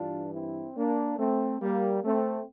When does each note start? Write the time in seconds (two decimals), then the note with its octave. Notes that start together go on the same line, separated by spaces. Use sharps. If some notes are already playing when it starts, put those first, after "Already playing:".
Already playing: G2 E3 D4 F4
0.33 C4 E4
0.76 A#3 D4
1.19 A3 C4
1.61 G3 A#3
2.03 A3 C4